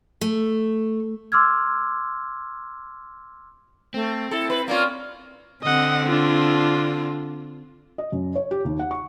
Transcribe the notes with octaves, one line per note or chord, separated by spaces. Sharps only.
A3
C6 D6 E6 F6 G#6
A3 C4
E4 A4
B4
A#3 C#4 F4 D5
D3 C4 D#5 F#5
D4 F4
D#5
F#2
C#5
G4
D#2
F#5
C#6